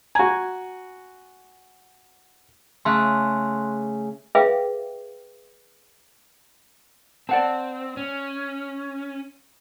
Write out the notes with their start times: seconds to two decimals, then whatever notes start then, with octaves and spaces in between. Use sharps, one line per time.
0.15 F#4 G#5 A#5 G#6
2.85 C#3 A3 C6 F#6
4.35 G#4 B4 E5 F5 G5 D6
7.29 C4 D5 F#5 A5
7.97 C#4